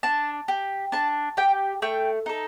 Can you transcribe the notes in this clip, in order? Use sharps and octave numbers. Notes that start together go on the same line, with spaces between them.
D4 A5
G4
D4 A5
G4 G5
A3 G5
D#4 A4